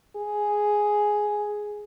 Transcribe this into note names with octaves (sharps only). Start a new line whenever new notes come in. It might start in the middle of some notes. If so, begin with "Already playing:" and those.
G#4